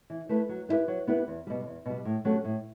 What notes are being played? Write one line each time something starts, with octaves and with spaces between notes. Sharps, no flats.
E3
A3 E4 B4
F#3
B3 E4 G4 B4
F#3
B3 E4 G4 B4
E2
B2 G3
E2
B2 G3
A2
F#3 A3 C#4 G4
A2